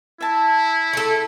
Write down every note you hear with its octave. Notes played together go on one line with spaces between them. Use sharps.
E4 E5 A5
A3 A4